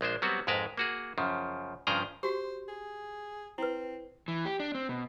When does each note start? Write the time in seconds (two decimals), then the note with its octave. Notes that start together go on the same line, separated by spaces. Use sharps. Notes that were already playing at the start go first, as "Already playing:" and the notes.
0.01 A#1 G#3 D4 C5
0.22 F#3 G3 B3 C4 F#4
0.47 F2 G#2 G#3 A#4 B4 A5
0.77 A#3 F#4 G#4
1.18 F#2 C#3 F3
1.87 G2 C#3 F3 G#4 G5 A#5
2.23 F#4 G4 C5
2.68 G#4
3.58 C4 E4 B4
4.28 E3
4.45 G4
4.60 D4
4.75 C4
4.89 B2